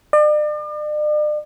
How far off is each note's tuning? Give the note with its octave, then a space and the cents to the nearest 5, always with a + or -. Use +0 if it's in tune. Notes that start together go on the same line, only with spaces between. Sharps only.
D5 +40